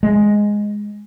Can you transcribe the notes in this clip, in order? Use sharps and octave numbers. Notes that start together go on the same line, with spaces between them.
G#3